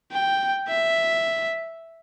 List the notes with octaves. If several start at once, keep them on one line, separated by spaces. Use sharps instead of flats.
G5
E5